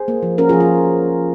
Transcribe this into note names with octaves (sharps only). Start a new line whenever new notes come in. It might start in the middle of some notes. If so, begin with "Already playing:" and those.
Already playing: G#4 C5
A#3
F3
C#4 F#4 A#4
F3 F4 G#4
F4